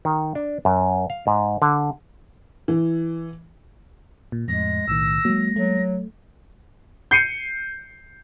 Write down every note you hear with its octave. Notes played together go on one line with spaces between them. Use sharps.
D#3
D4
F#2
F5
G#2
D3
E3
A#2
F2 A2 G#3 A#6
B1 A2 D#3 E6
F#3 G#3 A#3
F#3 A3
G6 C7 C#7 D#7